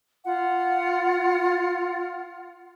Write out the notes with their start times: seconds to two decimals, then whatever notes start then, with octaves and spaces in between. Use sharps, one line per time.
0.25 F4 F#5